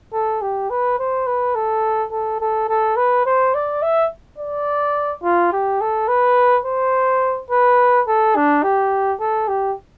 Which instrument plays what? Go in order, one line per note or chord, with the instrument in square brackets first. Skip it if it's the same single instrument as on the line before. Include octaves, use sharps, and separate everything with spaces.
[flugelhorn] A4
G4
B4
C5
B4
A4
A4
A4
A4
B4
C5
D5
E5
D5
F4
G4
A4
B4
C5
B4
A4
D4
G4
A4
G4